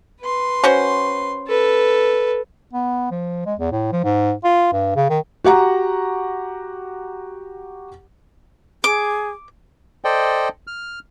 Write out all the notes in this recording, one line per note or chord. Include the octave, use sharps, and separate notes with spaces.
B4 C6
C#4 F#4 C5
A4 B4
B3
F3
G#3
E2
A2
F3
G#2
F4
G2
C#3
D#3
F#4 G4 F#5 A#5
G#4 D6
A4 C5 D5 D#5 G5
F6